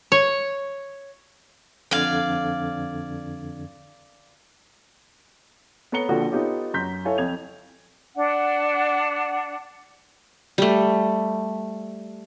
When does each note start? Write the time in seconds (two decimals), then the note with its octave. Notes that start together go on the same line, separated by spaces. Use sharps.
0.12 C#5
1.91 F2 D3 D5 F5 G#6
5.92 B3 A4 C#5 A#5 C#7 G7
6.08 A#1 D3 F3 F#4
6.30 B3 D#4 F4 G4 A4 C#5
6.74 F#2 A#5 C6 G6 B6
7.05 E4 A4 C#5 F5 G#5
7.18 F2 G#6 F7
8.16 D4 F#5
10.58 G3 A3